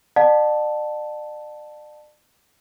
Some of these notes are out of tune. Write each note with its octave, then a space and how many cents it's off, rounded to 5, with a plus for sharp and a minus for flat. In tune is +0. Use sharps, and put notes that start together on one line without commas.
D5 +40 F#5 -45 A5 +0